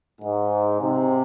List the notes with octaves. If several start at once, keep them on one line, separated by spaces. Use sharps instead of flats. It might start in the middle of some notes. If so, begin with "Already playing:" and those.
G#2
C3